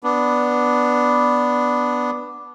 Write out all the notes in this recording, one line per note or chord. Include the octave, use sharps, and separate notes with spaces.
B3 D4